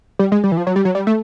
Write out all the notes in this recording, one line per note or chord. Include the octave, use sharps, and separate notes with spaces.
G3
G#3
G3
E3
F3
F#3
G3
F#3
G3
A3